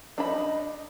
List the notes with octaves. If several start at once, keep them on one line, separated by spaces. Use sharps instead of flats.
D4 D#5 B5